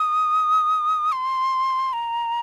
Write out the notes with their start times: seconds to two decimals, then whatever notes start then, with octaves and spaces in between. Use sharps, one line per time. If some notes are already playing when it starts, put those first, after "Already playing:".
Already playing: D#6
1.12 C6
1.93 A#5